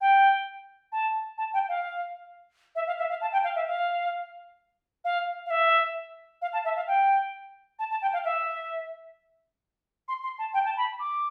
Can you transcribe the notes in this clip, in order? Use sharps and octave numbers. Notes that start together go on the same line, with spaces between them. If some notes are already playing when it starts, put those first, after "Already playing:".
G5
A5
A5
G5
F5
E5
F5
E5
F5
A5
G5
F5
E5
F5
F5
F5
E5
F5
A5
E5
F5
G5
A5
A5
G5
F5
E5
C6
C6
A5
G5
A5
B5
D6